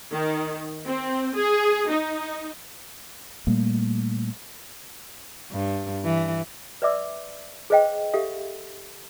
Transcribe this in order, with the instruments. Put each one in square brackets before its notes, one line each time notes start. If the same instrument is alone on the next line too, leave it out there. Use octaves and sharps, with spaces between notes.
[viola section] D#3
C4
G#4
D#4
[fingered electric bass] A#2 G3 A3 A#3
[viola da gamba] G2
E3
[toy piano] B4 D5 E5 D6 E6
G#4 B4 C5 D#5 F5 G5
G4 A4 E5 F5 D#6